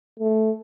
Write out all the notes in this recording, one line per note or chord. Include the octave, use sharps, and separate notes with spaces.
A3